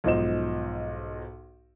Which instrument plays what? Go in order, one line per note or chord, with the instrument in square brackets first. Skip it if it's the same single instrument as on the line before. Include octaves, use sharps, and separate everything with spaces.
[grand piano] B1 G#2 F3 C5 D#5 E7